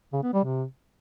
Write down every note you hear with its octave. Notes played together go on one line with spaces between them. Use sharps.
C#3
B3
G3
C3